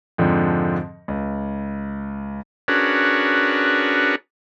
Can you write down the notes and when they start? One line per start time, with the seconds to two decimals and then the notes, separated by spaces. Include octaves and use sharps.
0.18 F2 G#2 D3 F3
1.08 C#2
2.68 C#4 D4 F#4 G#4 A#4 B4